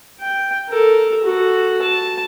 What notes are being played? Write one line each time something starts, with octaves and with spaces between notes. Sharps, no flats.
G5
A4 A#4
F#4 A4
A5